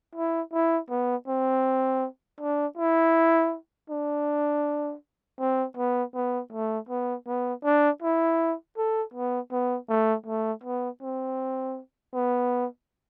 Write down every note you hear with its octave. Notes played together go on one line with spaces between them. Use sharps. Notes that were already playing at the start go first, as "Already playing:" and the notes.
E4
E4
B3
C4
D4
E4
D4
C4
B3
B3
A3
B3
B3
D4
E4
A4
B3
B3
A3
A3
B3
C4
B3